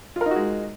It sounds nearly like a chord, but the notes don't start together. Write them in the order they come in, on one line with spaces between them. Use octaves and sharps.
F4 A#4 D#4 F#4 G#3